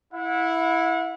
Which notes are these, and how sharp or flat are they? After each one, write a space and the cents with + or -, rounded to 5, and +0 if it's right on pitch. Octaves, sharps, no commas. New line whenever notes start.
E4 +0 F#5 -35